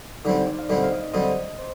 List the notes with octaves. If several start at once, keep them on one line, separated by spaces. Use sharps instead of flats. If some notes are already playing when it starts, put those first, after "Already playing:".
D3 G3 C4 D#4
C5
D5
F5
D3 G3 C4 D#5
F5
D#5
D3 G3 C4 D#5
C5